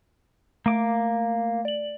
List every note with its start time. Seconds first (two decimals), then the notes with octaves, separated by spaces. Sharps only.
0.66 A3 A#3 D6
1.65 D5 F#7